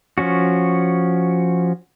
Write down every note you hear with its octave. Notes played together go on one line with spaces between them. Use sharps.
F3 C#4 F#4